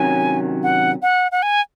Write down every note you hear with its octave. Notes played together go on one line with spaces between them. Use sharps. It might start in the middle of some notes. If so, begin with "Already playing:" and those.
Already playing: C3 D#3 F#3 C#4 G#5
F#5
F#5
F#5
G#5